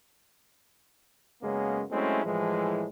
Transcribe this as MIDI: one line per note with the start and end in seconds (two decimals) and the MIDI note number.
1.42 1.84 42
1.42 1.84 49
1.42 1.84 56
1.42 1.84 58
1.42 1.84 59
1.42 1.84 61
1.92 2.23 54
1.92 2.23 56
1.92 2.23 57
1.92 2.23 60
1.92 2.23 61
1.92 2.23 64
2.25 2.87 45
2.25 2.87 52
2.25 2.87 53
2.25 2.87 56